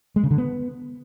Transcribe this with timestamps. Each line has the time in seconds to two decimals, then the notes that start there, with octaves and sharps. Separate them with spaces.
0.16 G#3
0.23 C#3
0.31 D3
0.38 B3